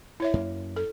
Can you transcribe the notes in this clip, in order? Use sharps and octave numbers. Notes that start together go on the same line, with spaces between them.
E4 C#5 E5
F#2 A#3
A4